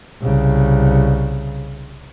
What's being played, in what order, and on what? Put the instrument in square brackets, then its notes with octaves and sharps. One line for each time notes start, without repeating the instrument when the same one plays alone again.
[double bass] C2 C#3